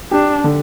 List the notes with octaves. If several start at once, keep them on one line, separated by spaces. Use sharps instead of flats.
D4 G4
D3